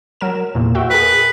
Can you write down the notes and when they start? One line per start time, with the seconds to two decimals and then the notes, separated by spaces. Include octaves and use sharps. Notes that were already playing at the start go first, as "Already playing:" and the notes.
0.21 F#3 A#4 E7
0.55 E2 A#2
0.75 F#4 E5 G5
0.90 G#4 A#4 B4